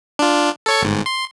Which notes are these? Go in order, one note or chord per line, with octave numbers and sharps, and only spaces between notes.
D4 F4
A4 C#5 C#6
G1 G#2
C6